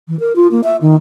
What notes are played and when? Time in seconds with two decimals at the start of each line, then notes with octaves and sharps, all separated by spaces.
0.08 E3
0.19 A#4
0.35 F4
0.51 A#3
0.63 E5
0.81 D#3